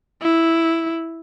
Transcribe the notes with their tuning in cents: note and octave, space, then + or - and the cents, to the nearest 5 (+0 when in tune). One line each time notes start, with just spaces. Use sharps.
E4 +0